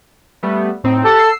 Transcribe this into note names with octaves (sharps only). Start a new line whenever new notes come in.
G3 A3 B3
A2 C4 D#4
G4 A4 F#5 A5
E6 C7